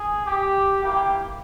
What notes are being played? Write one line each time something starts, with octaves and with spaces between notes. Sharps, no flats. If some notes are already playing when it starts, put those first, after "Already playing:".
Already playing: G#4
G4
A#3 E4 G4